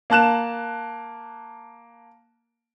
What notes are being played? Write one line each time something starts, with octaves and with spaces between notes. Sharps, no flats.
A#3 A5 F#6 E7